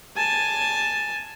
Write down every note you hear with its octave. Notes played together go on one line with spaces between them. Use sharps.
G#5 A5